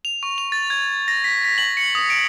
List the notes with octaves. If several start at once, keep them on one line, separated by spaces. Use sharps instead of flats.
F7
C#6
F7
A6
G#6
A#6
B6
B6
F#7
C#7
D#6
D7